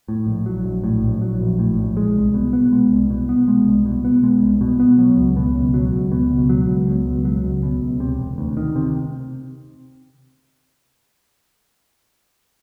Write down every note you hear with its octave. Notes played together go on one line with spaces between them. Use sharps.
A2
A#1
F#3
A#1
A2
A#1
F#3
A#1
A2
A#1
G#3
C2
B2
B3
G#3
C2
B2
B3
G#3
C2
B2
B3
G#3
C2
B2
B3
F#3
C#2
B2
C#2
F#3
C#2
B2
C#2
F#3
C#2
B2
C#2
F#3
C#2
B2
C#2
C3
E1
D2
D#3
C3